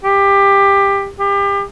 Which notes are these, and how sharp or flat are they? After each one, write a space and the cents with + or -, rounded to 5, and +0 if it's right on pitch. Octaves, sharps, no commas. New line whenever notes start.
G4 +20
G4 +30